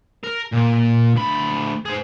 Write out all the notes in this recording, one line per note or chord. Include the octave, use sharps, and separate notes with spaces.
A#4
A#2
D2 B5
G#4 C5